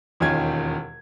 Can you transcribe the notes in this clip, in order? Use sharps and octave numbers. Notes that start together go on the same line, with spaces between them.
E1 D#2 D#3 C#4 F4 G#6